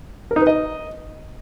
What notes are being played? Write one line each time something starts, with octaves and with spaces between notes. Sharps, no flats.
A#4
D#4
B4
D#5